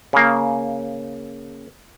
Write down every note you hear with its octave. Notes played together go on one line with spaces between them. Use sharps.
C#3 A#3